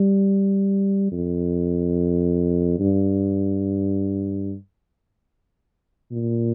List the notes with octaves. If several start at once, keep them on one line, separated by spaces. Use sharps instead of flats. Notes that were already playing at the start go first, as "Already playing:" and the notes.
Already playing: G3
F2
G2
A#2